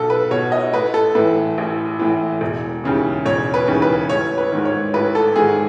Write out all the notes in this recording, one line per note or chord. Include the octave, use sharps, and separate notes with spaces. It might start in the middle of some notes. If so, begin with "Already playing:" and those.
Already playing: B1 B2 A4
B4
B2 C#5
D#5
A1 B4
A4
A2 E3 B4
A1
A2 E3
E1
D#2 C#3 E3
E1 C#5
B4
D#2 C#3 E3
B4
A1 C#5
B4
G#2 D#3
C#5
A1 B4
A4
G#2 D#3 G#4